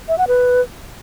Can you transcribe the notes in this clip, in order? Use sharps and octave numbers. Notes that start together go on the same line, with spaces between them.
E5
F#5
B4